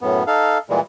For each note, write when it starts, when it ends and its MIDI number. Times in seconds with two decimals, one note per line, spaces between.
0.01 0.23 42
0.01 0.23 45
0.01 0.23 59
0.27 0.58 63
0.27 0.58 69
0.27 0.58 77
0.70 0.80 46
0.70 0.80 52
0.70 0.80 55
0.70 0.80 56